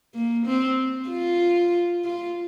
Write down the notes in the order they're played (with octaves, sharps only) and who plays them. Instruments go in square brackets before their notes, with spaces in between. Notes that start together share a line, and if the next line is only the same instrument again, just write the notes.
[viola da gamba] A#3
C4
F4
F4